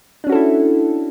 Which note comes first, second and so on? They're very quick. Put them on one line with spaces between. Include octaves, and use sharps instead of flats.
D4 C#4 F#4 A4 E4